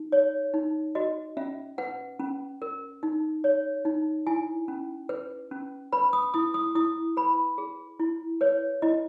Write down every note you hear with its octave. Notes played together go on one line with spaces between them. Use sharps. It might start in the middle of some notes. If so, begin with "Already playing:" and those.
Already playing: D#4
C#5
D#4
F#4 D#5
C#4 E5
B4 F#5
C#4
A#4
D#4
C#5
D#4
E4 G#5
C#4
B4
C#4
B4 B5
D#6
E4 D#6
D#6
E4 D#6
B4 B5
G#4
E4
B4 C#5
E4 D#5